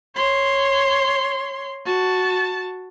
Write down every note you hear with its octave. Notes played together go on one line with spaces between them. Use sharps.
C#5 C6
F#4 A5